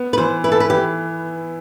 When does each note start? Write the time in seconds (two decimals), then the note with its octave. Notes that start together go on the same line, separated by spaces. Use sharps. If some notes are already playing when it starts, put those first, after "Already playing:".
Already playing: B3
0.13 B4
0.18 E3 C5
0.44 E4 B4
0.52 A4
0.60 B4
0.70 E3 G4